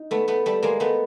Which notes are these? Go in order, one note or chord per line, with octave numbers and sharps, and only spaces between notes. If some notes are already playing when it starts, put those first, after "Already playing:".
Already playing: D#4
A3 B3
A3 B3
G3 A3
G#3 A#3
A3 B3